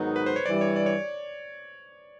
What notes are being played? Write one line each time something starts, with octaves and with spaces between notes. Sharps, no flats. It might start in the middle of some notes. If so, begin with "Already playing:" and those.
Already playing: G#2 D#3 F#3 B3 D#4
B4
C5
C#5
G2 E3 G3 D5
C#5
D5
C#5